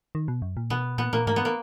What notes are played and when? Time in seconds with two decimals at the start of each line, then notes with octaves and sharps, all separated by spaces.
0.15 D#3
0.28 B2
0.42 F#2
0.57 A#2
0.70 B2 B3
0.98 A#2 B3
1.13 A#2 A#3
1.27 G#2 A#3
1.36 B3
1.45 A#3